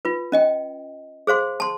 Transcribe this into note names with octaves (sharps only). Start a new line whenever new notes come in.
F4 B4
C#4 D#5 G5
G#4 C5 F5 C6
A5 C6